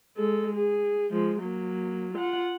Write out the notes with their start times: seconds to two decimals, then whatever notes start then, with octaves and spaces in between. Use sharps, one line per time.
0.17 G#3 A4
0.55 G#4
1.11 F3 G#3
1.40 F#3 A#3
2.14 F4 F#5